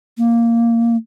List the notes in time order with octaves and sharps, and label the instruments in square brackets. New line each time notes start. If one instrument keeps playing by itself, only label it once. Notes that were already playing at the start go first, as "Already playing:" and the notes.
[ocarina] A#3